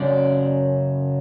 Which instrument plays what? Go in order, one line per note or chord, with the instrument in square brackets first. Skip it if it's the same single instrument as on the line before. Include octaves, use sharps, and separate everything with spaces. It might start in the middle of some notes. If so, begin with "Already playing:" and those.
Already playing: [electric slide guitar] F#2 C#3 F#3 D5